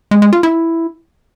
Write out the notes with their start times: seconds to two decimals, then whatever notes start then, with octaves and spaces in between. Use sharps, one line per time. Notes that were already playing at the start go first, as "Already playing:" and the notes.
0.11 G#3
0.22 G#3
0.33 F4
0.43 E4